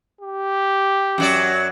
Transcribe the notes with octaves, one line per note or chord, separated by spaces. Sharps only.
G4
F#2 F#3 D5